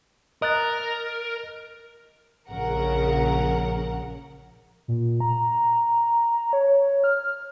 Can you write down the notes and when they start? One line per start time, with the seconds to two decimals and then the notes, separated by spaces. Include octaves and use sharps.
0.42 A#4 D#5 F#6 A6
2.50 A#1 C#3 A#4 F#5
4.88 A#2
5.20 A#5
6.53 C#5
7.04 F6